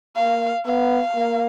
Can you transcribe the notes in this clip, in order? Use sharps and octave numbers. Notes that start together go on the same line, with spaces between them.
A#3 F5
B3 F5
A#3